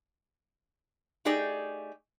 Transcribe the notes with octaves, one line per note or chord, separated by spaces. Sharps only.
A3 D#4 G4 G#4 D5